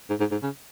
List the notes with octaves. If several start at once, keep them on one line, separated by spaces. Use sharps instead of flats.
G#2
G#2
G#2
C#3